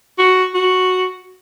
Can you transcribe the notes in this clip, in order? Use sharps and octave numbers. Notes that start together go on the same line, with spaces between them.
F#4
F#4